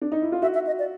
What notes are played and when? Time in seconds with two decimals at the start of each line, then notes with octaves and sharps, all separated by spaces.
0.02 D4
0.12 D#4
0.22 E4
0.32 F4
0.42 F#4 E5
0.54 E5
0.67 D#5
0.79 D5